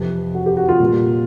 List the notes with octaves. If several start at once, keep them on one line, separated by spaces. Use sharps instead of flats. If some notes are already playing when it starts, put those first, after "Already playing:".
Already playing: F2 C3 E3
F#4
G4
F#4
F4
A#2 G3 A#3